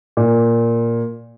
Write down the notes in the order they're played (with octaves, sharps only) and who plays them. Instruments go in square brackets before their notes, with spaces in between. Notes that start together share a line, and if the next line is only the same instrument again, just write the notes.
[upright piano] A#2